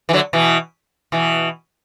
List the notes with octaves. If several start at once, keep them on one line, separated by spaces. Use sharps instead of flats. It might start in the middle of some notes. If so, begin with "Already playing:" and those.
E3
D3 F#3
B2 E3
B2 E3